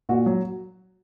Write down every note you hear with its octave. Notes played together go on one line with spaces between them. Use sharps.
A#2 F#4
F#3